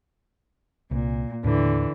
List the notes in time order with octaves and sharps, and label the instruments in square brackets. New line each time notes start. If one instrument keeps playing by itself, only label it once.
[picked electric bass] C2 [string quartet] A#2
[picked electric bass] D#2 A2 D4 [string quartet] D3 E3